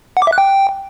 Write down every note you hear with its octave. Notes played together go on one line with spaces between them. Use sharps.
F#5
D6
E5
F#6
G5